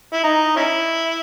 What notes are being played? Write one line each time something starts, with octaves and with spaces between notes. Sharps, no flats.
E4
D#4
C#4 E4